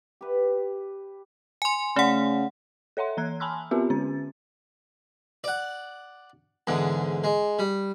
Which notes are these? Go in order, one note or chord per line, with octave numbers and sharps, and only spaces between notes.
G4 B4
G#5 C6
C#3 A3 F#5
A4 C#5 E5 F#5 C6
E3 A#5 F#6 G#6
G#5 A5 B5 C6 E6 F6
B3 C4 F4 G4 A#4 E5
D3 C#4 A6
D5 F#5
E2 G#2 D3
G#3
G3